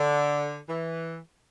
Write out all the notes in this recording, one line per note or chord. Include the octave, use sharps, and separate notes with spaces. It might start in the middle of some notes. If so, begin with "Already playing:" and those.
Already playing: D3
E3